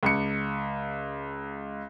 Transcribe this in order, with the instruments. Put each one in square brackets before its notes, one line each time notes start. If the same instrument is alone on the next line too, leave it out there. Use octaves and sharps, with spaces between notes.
[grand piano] C#2 C#7